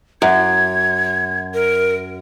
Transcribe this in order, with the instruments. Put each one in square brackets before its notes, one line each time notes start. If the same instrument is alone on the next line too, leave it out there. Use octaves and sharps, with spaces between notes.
[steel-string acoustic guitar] F#2 [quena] G#6
[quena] A#4